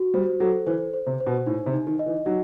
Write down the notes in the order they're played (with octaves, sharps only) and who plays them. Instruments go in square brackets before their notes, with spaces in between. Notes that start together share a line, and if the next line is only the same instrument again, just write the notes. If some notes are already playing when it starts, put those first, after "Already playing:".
Already playing: [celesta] F#4
[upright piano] G3 [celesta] C5
[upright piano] F#3 [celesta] A4
[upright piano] E3 [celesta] C5
[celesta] C5
[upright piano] C3
[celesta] C5
[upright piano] B2
[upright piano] A2 [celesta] D#4
[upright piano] C3
[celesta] D#4
[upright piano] D#3
[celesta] D#5
[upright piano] E3
[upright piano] F#3 [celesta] D#4